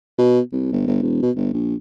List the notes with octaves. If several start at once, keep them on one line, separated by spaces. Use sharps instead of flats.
B2
C2
G1
G1
E1
B2
G1
A#1